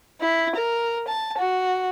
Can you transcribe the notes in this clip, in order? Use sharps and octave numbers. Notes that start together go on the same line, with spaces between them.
E4
A#4
A5
F#4